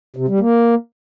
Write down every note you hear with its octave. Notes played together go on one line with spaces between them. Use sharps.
C3
G3
A#3